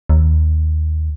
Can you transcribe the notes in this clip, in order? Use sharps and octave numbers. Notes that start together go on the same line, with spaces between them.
D#2